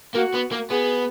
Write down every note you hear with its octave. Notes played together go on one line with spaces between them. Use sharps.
A#3 F#4
B3
A#3
B3 G#4